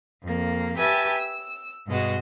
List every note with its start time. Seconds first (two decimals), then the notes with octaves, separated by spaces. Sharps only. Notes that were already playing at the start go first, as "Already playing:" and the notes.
0.24 F2 A#3
0.78 G4 B4 E5 G#5 A5
1.18 E6
1.88 G2 B2 G#3 F#4